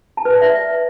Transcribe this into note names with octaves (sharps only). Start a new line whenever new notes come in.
A5
B4
D5
E5